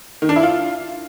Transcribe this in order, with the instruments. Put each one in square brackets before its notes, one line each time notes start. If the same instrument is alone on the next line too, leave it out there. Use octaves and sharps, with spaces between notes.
[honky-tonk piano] D#3
D4
E4
F4